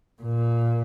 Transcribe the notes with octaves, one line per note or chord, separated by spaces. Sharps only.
A#2